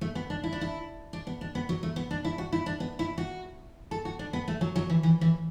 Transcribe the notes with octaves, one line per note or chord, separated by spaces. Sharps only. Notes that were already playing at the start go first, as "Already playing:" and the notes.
A3
B3
D4
E4
D4
E4
D4
B3
D4
B3
F#3
A3
B3
D4
E4
F#4
E4
D4
B3
E4
F#4
A4
F#4
D4
B3
A3
F#3
F#3
E3
E3
E3